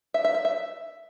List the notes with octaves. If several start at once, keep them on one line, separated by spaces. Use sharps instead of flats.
E5
E5
E5
E5